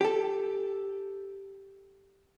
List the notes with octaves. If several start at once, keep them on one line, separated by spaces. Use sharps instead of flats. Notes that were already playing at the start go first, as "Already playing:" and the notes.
G4 A4